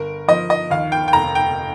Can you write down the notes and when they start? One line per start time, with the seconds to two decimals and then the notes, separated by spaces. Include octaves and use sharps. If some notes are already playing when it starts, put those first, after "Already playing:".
Already playing: G1 A#4
0.28 F3 D#5
0.50 D#5
0.70 D#2 F5
0.92 G5
1.08 G5
1.13 F1 A#5
1.35 G5